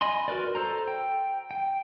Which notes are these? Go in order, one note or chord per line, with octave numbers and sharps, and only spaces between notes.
D#5 G#5 B5 C6
F#4 A#4 B4 D5
A4 C5 A#5
G5
G5